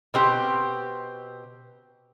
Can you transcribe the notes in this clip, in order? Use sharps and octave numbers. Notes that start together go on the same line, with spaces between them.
B2 C4 G4